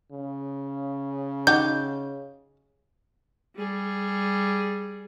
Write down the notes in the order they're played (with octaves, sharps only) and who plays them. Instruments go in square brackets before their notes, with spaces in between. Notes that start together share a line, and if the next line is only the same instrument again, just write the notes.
[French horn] C#3
[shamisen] D#4 F#4 G4 [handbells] G6
[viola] G3 G#4